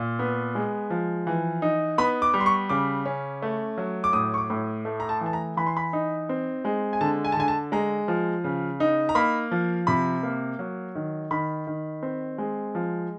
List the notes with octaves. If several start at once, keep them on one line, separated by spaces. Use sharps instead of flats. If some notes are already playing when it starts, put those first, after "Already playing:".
Already playing: A#2
B3
G#3
F3
E3
D#4
B3 B5
D6
G3
C6
C#6
C#3 D6
C#4
A3
F#3
D6
A2 D#6
C#6
D6
A2
A3
A#5
A5
E3 A5
A#5
E3 B5
C6
B5
D#4
C4
G#3
G#5
D3 A5
G#5
A5
D3 G#5
A5
G#3 A#5
F3
C#3
D#4
A#5
A#3 B5
F3
C3 B5
A#3
F#3
D#3
D#3 B5
D#3
C4
G#3
F3